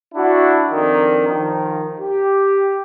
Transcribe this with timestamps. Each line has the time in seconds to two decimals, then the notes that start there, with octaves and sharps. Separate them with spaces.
0.15 D4 E4 F#4
0.71 F2 D#3 D4
1.28 D#3 F3
1.99 G4